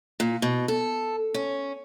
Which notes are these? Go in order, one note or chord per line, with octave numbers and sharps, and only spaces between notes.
A#2
B2
A4
C#4